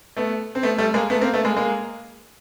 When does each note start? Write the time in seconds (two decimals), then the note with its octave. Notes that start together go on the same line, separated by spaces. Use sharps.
0.17 A3 B3
0.55 C4
0.63 A3 B3
0.78 G3 A3
0.94 G#3 A#3
1.10 A3 B3
1.21 A#3 C4
1.34 A3 B3
1.45 G#3 A#3
1.57 G#3 A#3